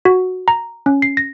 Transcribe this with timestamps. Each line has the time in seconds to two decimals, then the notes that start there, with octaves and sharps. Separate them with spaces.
0.05 F#4
0.48 A#5
0.86 C#4
1.02 C7
1.17 A#6